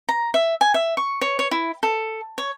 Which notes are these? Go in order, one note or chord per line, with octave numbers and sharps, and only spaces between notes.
A#5
E5
G#5
E5
C#6
C#5
C#5
E4
A4
C#5